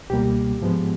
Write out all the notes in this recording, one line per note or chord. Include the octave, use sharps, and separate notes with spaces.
C#2 B2 G3 A#3 G4
G#2 F3 G#3 B3